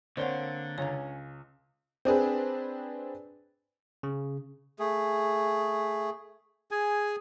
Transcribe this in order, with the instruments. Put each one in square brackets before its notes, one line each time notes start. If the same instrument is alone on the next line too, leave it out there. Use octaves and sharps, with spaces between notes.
[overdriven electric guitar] D3 [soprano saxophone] A#3 [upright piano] C4 C#5 G7 [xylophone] D5 F#5
[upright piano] C#2 [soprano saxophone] C#4 [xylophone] C#5 A#5
[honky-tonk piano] C4 D4 G#4 B4
[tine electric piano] C#3
[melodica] A3 G#4
G#4 G#5